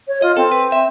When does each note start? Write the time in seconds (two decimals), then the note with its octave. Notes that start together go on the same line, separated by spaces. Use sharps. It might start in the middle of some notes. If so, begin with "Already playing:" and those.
0.08 C#5
0.22 F4 D#5
0.37 C4 A4
0.52 B4
0.72 E5